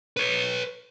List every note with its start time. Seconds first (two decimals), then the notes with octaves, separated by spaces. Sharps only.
0.17 B4 C#5